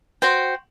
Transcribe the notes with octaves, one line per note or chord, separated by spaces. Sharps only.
F#4 C5 G5